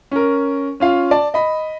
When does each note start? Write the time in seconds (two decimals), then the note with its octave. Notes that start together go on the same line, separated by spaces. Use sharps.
0.11 C#4 A#4
0.80 C#4 F4 F5
1.11 D5 A5
1.34 D#5 B5